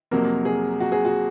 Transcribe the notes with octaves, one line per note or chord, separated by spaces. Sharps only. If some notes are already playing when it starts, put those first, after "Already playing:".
F2 C3 F#3 A#3 A#4
G#4
F#4
G#4
F#4